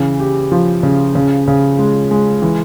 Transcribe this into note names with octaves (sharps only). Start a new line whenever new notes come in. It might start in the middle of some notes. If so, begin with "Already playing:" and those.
Already playing: C#3 E3
G4
F3
C#3
C#3
C#3
G#3
G#3
E3